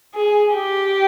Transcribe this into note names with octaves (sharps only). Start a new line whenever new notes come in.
G#4
G4